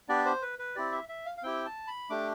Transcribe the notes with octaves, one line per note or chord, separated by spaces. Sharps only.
B3 D4 G4 D5
C5
B4
B4
C4 E4 G4 D5
E5
E5
F5
F5
C4 E4 G4 G5
A5
B5
A3 D4 G4 D6